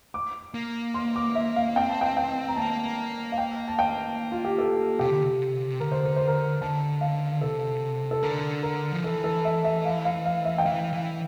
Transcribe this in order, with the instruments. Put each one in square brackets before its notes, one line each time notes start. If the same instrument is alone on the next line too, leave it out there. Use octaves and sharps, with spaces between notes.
[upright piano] D6
[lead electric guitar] A#3
[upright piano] C6
D6
E5
F5
[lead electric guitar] C4 [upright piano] G5
[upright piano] A5
G5
G5
A#5
[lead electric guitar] A#3 [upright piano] A5
[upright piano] F5
G5
A5
G5
F4
G4
A4
[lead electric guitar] C3 [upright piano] G4
[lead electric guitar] D3
C3
[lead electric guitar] D3 [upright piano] A#4
[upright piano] C5
A#4
C5
A#4
[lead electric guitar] D3 [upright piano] A5
[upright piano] F5
[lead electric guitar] C3 [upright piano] A4
[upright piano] A4
[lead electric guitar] D3 [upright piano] A#4
[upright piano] A#4
[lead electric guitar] F3
[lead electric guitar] E3 [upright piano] A4
[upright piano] A4
E5
E5
F5
F5
F5
E5
G5
[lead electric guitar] E3 [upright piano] F5
[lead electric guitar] E3